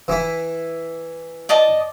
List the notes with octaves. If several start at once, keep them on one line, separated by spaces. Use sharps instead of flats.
E3 E4
D5 D#5 A5